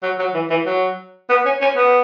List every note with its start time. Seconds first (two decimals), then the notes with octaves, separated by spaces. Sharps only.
0.03 F#3
0.19 F#3
0.34 E3
0.50 E3
0.66 F#3
1.29 B3
1.45 C#4
1.61 C#4
1.77 B3